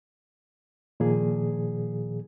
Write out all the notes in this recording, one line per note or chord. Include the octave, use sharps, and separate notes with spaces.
A#2 D#3 F3 A#3 G#4